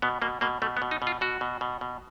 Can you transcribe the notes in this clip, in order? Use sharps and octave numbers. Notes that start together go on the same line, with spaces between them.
B2 B3
B2 A#3
B2 A#3
B2 A3
B3
B2
D#4
B2
F4
B2 F#4
B2
B2
B2